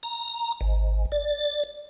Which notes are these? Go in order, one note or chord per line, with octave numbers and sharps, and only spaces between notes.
A#5
G#1
D5